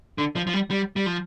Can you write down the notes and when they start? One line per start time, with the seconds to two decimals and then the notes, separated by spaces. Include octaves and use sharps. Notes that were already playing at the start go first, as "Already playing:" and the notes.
0.18 D3
0.36 F3
0.47 F3
0.54 G3
0.71 G3
0.96 G3
1.06 F3